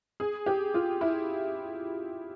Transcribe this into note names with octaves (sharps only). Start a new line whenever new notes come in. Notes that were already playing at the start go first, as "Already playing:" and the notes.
G#4
G4
F4
E4